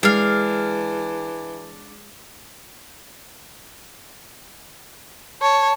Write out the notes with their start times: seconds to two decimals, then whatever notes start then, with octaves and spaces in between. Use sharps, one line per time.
0.03 E3 G#3 D4 F5
5.42 C#5 A5